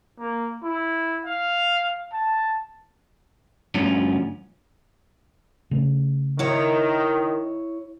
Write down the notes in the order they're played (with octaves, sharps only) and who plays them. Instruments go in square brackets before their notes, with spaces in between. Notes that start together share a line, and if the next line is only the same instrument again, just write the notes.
[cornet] A#3
E4
F5
A5
[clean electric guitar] D2 G2 D3 F3 C#4
[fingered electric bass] C#3 A3
[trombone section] D#3 [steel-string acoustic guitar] E4 C#5